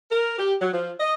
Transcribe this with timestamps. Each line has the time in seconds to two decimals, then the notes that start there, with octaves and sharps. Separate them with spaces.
0.10 A#4
0.38 G4
0.61 F#3
0.73 F3
0.99 D#5